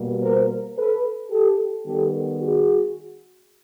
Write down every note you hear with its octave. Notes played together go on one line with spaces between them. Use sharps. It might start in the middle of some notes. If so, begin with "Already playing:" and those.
Already playing: B2 G3 A#3
A#4 C5
A4 B4
G4 A4
D#3 G3 B3 G4 A4
F#4 G#4